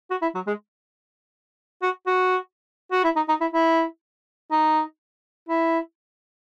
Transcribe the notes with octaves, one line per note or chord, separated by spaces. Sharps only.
F#4
E4
F#3
G#3
F#4
F#4
F#4
E4
D#4
D#4
E4
E4
D#4
E4